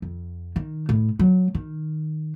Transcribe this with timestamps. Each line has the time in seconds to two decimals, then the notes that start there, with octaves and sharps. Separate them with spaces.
0.02 F2
0.56 D#3
0.89 A2
1.19 F#3
1.54 D#3